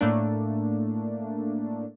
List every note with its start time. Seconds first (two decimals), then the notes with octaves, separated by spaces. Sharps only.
0.01 A2 A3 A#3 D4